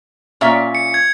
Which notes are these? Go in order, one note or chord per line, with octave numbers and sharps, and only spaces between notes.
A#2 C#4 E5
C#7
G#6